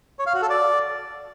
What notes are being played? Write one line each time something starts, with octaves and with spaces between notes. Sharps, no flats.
C#5
F5
F#4
A4
D5